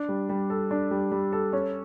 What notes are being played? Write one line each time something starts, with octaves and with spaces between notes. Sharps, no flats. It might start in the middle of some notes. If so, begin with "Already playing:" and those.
Already playing: D4
G3
G3
A4
D4
G3
G3
A4
C#4